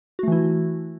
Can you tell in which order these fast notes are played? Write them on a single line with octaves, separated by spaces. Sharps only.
F#4 A3 E3 E4